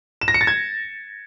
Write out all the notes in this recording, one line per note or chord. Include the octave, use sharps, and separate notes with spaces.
E7
A#6
C#7
A6
G#6